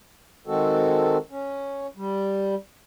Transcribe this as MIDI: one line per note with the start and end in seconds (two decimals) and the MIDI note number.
0.47 1.17 51
0.47 1.17 56
0.47 1.17 60
0.47 1.17 66
0.47 1.17 69
1.30 1.87 61
1.96 2.55 55